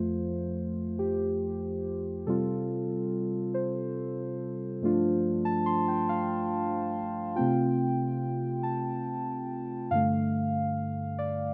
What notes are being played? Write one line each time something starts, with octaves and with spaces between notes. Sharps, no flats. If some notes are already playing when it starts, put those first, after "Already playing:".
Already playing: F2 F3 A3 F4 C5
G4
C3 G3 C4 F4 A4
C5
G2 F3 A3 D4 F4
A5
C6
G5
F5
C3 A3 C4 F4 G5
A5
G2 D3 A3 F5
D5